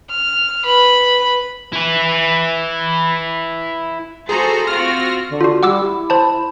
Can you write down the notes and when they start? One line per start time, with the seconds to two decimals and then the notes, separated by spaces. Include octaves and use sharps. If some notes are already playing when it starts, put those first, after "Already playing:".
0.10 F6
0.65 B4 B5
1.73 E4 B4
4.29 F#4 G#4 A4 C5 A#5
4.67 C4 F4 F#4 F6 A#6
5.29 D3
5.41 F4 F#4
5.63 G3 F#5 D6 E6
5.83 E4
6.10 C5 A5